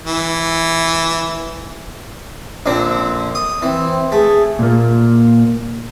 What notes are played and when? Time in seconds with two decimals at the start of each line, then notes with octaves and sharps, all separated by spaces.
0.06 E3
2.66 A#1 D3 C4
3.35 D#6
3.62 E3 C4
4.12 A3 G#4
4.59 A#2 A#3